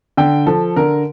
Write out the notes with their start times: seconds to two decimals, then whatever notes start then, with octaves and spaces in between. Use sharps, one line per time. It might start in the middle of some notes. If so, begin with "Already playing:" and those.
0.17 D3 G5
0.46 F3 A4
0.76 D3 A#4